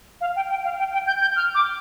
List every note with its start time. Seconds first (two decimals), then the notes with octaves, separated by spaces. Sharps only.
0.21 F5
0.36 G5
0.50 G5
0.64 F5
0.79 G5
0.93 G5
1.07 G6
1.21 G6
1.36 F6
1.55 D6